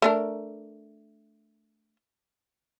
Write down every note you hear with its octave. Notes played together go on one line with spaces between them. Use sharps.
A3 D4 A#4